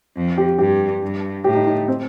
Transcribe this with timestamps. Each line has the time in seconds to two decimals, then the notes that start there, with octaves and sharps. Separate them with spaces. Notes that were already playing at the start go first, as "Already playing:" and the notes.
0.16 F2
0.38 G4
0.59 G2 G4
1.02 G2
1.44 A2 G4
1.55 D#4
1.66 D#4
1.88 C4